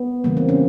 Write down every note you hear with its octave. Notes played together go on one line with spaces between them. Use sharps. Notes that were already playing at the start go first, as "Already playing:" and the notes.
Already playing: B3
C#3 E3 G3 A#3
C4
C#4